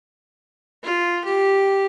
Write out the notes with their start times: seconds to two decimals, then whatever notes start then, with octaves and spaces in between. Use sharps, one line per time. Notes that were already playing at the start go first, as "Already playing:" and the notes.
0.84 F4
1.25 G4